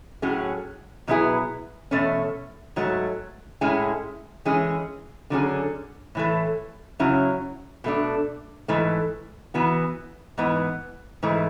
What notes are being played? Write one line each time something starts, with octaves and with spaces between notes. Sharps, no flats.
A2 F#3 C#4 G#4
B2 F#3 B3 E4 G#4
E2 B2 A3 C#4
G#2 F#3 A3
A2 G#3 C#4 E4 G#4
E3 G#3 C#4 G#4
D3 F#3 C#4 G#4
A2 E3 A3
F#2 C#3 F#3 C#4 E4
B2 A3 D4
G#2 E3 A3
E3 B3 F#4
G#2 E3 B3
G#2 E3 A3